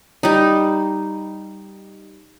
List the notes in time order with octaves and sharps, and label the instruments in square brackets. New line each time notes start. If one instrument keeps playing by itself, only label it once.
[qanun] G3 D#4